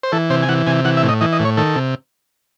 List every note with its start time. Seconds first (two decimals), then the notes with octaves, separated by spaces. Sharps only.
0.03 C5
0.12 E3 A4
0.30 C3 C5
0.42 G#5
0.49 E3 F#5
0.67 C3 G#5
0.85 E3 F#5
0.97 E5
1.03 A2
1.09 D#5
1.21 E3 D#5
1.33 D#5
1.40 A2
1.45 C#5
1.57 D#3 A4
1.76 C3